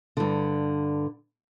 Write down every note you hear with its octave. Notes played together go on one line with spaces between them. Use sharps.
G2 D3